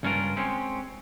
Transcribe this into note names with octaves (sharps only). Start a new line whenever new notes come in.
C#2 G2 C#4 D4 F4 A#4
G#3 C4 C#4